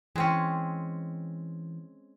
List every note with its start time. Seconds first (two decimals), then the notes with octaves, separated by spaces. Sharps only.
0.16 E3 G#3 C4 C#4